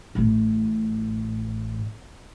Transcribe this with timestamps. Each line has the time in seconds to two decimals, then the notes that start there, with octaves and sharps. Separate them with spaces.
0.15 A1 A2